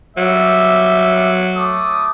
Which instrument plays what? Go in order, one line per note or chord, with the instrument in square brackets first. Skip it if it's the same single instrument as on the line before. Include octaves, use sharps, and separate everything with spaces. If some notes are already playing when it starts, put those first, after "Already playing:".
[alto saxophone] F#3 [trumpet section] G3 E5
[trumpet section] A3 D6 D#6